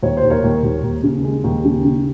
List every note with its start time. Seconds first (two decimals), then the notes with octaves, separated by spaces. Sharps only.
0.03 D#2 C#5
0.17 C5
0.24 D#2
0.30 A#4 C#5
0.44 D#2
0.64 D#2
0.83 D#2
1.04 C#3
1.24 G#3
1.44 D#2
1.65 C#3
1.85 C#3